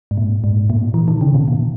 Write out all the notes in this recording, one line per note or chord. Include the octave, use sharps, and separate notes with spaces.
G#2
A#2
G#2
A#2
E3
D#3
C#3
B2
A#2